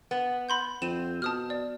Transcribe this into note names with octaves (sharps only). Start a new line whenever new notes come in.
B3
B5 C6 G6
F2 C4 D#7 E7
B2 A5 D#6 F6
D5